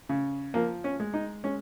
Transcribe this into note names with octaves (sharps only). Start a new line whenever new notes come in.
C#3
F3 A#3
C#4
G#3
D#4
G#3 C#4